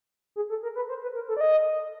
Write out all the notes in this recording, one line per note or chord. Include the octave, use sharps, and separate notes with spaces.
G#4
A4
A#4
B4
C5
B4
A#4
A4
D5
D#5